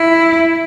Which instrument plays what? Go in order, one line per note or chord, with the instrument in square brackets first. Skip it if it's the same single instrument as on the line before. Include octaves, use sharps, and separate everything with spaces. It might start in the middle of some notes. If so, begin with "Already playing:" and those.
Already playing: [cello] E4